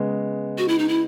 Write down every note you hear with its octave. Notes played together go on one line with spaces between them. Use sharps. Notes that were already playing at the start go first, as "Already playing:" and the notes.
Already playing: C#3 G#3 B3
F#4
E4
D#4
E4